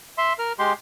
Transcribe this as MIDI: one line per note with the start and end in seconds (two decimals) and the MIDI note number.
0.18 0.33 76
0.18 0.33 84
0.39 0.53 70
0.39 0.53 89
0.59 0.73 56
0.59 0.73 67
0.59 0.73 84